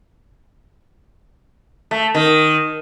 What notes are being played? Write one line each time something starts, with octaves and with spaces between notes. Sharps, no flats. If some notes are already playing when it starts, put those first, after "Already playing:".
A3
D#3